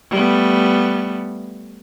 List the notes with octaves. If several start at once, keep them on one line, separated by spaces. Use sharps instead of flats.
G3 A3 B3